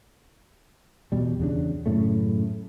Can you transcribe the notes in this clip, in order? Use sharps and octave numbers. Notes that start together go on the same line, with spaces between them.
E2 B2 G3
E2 C#3 D4
F#2 A2 C#3 A3